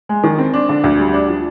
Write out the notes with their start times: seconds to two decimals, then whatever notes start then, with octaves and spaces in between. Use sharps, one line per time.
0.09 G#3
0.24 D#3
0.39 C4
0.54 D4
0.69 D3
0.84 D2
0.99 G3
1.14 D4
1.28 F3